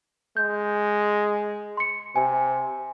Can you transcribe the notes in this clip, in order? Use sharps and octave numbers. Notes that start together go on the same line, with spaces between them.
G#3 G6
C6 C#7
C3 G#5